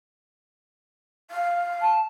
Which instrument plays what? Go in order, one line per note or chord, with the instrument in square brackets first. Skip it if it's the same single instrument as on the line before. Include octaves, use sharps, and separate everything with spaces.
[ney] F5
[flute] A5